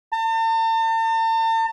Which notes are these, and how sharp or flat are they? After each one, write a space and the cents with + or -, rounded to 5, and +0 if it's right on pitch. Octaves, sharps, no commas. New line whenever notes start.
A5 +45